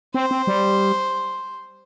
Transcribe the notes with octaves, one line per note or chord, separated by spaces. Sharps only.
C4 C5
C4
G3